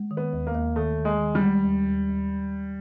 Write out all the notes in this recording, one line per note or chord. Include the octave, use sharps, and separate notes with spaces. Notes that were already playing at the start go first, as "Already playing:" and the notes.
Already playing: G#3
D#3
B3
D#2
A#3
D#2
D#3 A3
D#3
G#3
D#3
G3
G#3
D#2
D#2
D#2